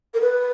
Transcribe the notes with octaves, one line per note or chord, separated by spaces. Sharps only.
A#4
B4